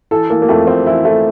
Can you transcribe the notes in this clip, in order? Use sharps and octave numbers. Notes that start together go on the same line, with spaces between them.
E3 A4
E3 A#3
A#3
F2 A3
F2 C4
E3 E4
E3 A3